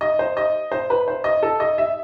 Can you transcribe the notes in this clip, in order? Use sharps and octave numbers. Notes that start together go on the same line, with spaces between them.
D#5
C5
D#5
C5
B4
C5
D#5
A4
D#5
E5